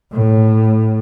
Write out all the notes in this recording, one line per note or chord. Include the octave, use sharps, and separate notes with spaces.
A2